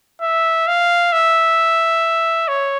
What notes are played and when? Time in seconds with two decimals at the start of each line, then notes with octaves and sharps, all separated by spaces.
0.21 E5
0.67 F5
1.12 E5
2.48 C#5